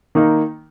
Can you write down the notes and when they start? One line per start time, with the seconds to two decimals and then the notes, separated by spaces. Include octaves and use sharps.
0.15 D#3 A#3 D#4